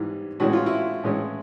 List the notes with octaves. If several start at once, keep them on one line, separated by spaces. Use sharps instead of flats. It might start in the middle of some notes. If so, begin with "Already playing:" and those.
Already playing: G#2 E3 G3
A2 E3 G#3 C#4 F#4
F4
E4 F#4
A2 E3 G#3 C#4